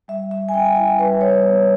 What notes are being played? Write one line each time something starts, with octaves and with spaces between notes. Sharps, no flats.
G3 E5
G3 E5
G#5
C#4 G5
G#5
E4 G#5
E5
G3 B4
G3 C#5
B3